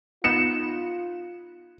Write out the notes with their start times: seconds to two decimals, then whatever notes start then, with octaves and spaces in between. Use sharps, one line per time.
0.24 B3 D#4 F4 C#7 E7